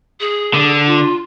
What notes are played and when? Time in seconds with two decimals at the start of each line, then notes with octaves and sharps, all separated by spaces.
0.21 G#4
0.54 D3
0.86 F4